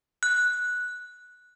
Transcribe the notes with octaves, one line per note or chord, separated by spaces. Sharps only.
F#6